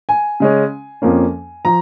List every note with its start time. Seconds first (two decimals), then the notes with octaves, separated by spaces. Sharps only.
0.09 G#5
0.40 C#3 G#3 C#4
1.02 F2 F3 A#3 C#4
1.65 F3 A#5